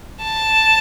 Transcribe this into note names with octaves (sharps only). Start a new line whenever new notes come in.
A5